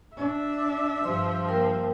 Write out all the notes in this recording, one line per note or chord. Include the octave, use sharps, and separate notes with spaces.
D4 E5
G2 F3 C6
A#3 A#4 G5